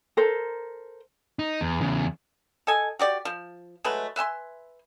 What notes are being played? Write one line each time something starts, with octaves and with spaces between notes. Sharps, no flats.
A4 A#4 C5
D#4
E2
E2 C#3
A4 D#5 G#5
F#4 G4 D5
F3
F#3 G#3 A3 B4
B4 E5 G#5 C6